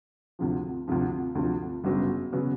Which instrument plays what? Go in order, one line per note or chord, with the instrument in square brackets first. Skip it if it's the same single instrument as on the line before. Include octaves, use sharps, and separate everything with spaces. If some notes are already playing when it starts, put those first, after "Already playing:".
[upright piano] D2 C3 F3
D2 C3 F3
D2 C3 F3
G1 F#2 C#3 F#3 B3
C#3 F#3 B3